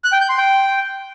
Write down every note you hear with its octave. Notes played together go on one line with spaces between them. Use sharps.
F#6
G5
G6
C6
G5